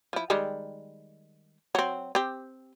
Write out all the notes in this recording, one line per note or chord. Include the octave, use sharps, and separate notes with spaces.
F3 E4
D#3 G3 G#3
F#3 C4
C4 G4